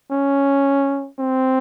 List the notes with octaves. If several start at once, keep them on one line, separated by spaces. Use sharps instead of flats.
C#4
C4